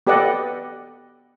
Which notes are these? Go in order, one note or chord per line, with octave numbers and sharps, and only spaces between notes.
B3 G4 A4 D5 D#5 F#5